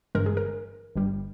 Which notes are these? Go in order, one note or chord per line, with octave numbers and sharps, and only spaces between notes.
G1 G2 E3 G#3 A#4
G#4
A#4
G1 G2 G3